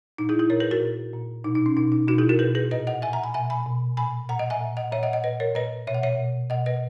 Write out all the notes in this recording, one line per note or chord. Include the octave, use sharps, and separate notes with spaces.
A#2 D#4
E4 G#4
E4 G#4
A#2 A#4 C#5
G#4 B4
F#4 A#4
A#2
A#2
B2 D#4
D#4
C#4
B2 D#4
D#4
B2 D#4 F#4
E4 G#4
F#4 A#4
B2 G#4 B4
G#4 B4
A#2 B4 D#5
D#5 F#5
A#2 E5 G#5
F#5 A#5
G#5 B5
B2 E5 G#5
G#5 B5
B2
A#2 G#5 B5
A#2 F#5 A#5
D#5 F#5
E5 G#5
A#2
D#5 F#5
A#2 C#5 E5
D#5 F#5
D#5 F#5
A#2 B4 D#5
A#4 C#5
A#2 B4 D#5
B2 C#5 E5
F#5
C#5 E5
B2
B2 D#5 F#5
B4 D#5